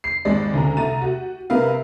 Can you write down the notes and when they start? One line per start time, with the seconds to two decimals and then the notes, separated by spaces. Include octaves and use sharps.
0.04 C7
0.25 G#1 D#2 G#3 G4 D5
0.54 D2 C#3 A#5
0.77 C2 A3 A#5 A6 D#7
1.01 F#4 G4
1.50 C3 A#4 B4 F5